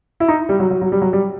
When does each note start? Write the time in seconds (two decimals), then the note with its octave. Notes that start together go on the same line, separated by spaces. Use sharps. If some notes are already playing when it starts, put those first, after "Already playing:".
0.20 E4
0.28 D#4
0.49 G3
0.60 F#3
0.71 F#3
0.82 F#3
0.92 G3
1.02 F#3
1.13 G3